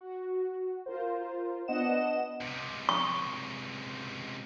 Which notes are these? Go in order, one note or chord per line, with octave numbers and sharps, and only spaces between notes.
F#4
F4 A#4 C5
B3 D4 D#5 F#5 E7
C#2 C3
C#6